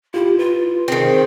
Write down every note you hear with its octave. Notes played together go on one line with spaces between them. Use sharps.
E4 F4 G4
F4 B4
D#3 C4 G#4